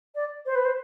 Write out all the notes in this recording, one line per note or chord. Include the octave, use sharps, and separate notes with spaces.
D5
C5
B4
C5